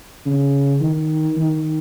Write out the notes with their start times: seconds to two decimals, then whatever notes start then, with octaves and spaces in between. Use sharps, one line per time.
0.26 C#3
0.81 D#3
1.37 D#3